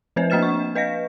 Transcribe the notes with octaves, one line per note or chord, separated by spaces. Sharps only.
F3 C4 B4 C5 E5
A#3 D4 D#5 F6 A6 E7
C#6
B4 D#5 F5 A#6